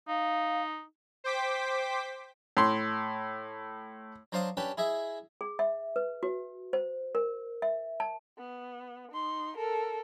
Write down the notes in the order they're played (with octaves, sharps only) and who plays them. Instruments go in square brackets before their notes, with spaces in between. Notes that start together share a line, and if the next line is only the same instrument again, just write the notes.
[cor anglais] D#4 [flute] F5
[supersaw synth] C5 G5 D6 B6
[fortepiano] A2 C6
[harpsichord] F#3 D4 C5 F5 A5 D#6
C#4 D4 G4 B4 A5
E4 G#4 D#5 E5
[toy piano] G#4
E5
B4
F#4
C5
A#4
E5
A5
[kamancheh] B3
D#4 C6
A4 A#4